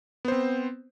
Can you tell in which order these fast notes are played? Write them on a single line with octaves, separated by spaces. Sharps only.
B3 C5 C4